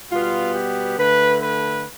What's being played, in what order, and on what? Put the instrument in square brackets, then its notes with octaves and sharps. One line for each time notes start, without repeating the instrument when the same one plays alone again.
[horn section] B2 G3 B3 F4
G4
D3 A3 B4
B4